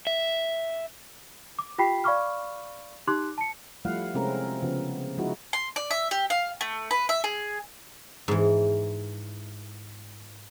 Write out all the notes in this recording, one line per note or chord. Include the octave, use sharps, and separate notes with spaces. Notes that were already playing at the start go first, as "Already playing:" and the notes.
E5
D6
F4 G4 G5 B5 B6 C7
D5 F5 B5 C#6 D6 F6
D#4 G4 C6 D6 F#6
A5 C#7
F3 G3 A3 E4 F5 F#5
C3 G#3 C4 C#4 E4 A#4
C#3 F3 B3
F3 G#3 D#4 E4 F#4
C6
D5
E5
G4
F5
A3
B4
E5
G#4
G#2 E3